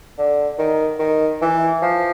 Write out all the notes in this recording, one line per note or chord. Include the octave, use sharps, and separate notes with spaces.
D3
D#3
D#3
E3
F3